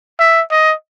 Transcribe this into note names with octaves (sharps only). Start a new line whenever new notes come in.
E5
D#5